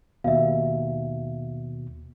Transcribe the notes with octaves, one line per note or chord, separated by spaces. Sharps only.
D#2 B2 E5 F5